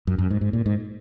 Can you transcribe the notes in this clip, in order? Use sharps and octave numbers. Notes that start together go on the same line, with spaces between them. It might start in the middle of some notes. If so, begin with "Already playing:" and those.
F#2
F#2
G#2
G#2
A#2
G#2